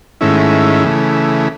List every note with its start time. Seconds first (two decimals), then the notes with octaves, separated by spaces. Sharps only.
0.21 G#2 D#3 A3 C#4 E4
0.85 C#3 E3 A3